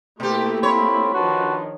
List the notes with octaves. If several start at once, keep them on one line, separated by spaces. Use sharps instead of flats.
B2 A3 A#3 E4 G4 G5 C6
C4 F4 C#5 B5
D#3 F3 D4 F#4 B4 A5 C6